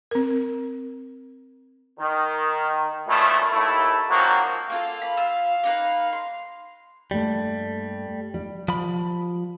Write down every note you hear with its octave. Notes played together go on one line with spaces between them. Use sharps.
C4 A#4
D#3
F#2 A#2 D#3 E3 A3
D#2 A3 E4
G#2 F3 F#3 A#3 C4 F#4
A#3 F4 A4 F5
B5
F4 E6
A#3 D#4 B4
C6
G2 G3 A3 A#3
G3
F3 B5